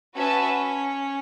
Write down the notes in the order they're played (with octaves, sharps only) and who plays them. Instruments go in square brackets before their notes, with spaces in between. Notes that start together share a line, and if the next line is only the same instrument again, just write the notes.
[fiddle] C#4 [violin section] F#4 B4 E5 A5